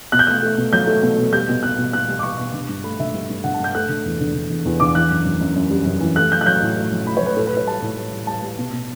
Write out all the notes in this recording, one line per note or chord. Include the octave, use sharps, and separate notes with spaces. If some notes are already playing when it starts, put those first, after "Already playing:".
B2 F#6
G6
A3 F#6
A3
B2
F#3 G6
A3
B2
B2
G3 G6
B2
B2 F#6
B2
B2 F#6
G3
D6
G3 C#6
B2
D3
G2
A3 B5
D3 E5
G2
G2
D3 F#5
A5
G2 G6
A3 F#6
D3
E2
D3
D3
E2
E2
D3 D6
E3 F#6
F#2
F#2
F#2
F#2
G3
F#2
E3
A3 F#6
F#3 G6
F#6
F#3 G6
A2
A3
F#3
A2 B5
C#5
F#3
B4
A2 A4
B4
A2 C#5
G3 A5
A2
G3
G3
G3 A5
G3
B2
B2